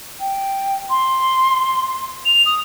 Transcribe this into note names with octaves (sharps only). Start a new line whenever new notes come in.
G5
C6
F7
D#6